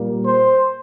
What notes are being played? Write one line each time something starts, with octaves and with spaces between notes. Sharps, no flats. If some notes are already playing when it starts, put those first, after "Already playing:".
Already playing: A#2 G3 A#3
C5